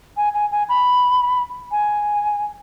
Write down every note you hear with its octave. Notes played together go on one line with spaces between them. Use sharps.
G#5
G#5
G#5
B5
G#5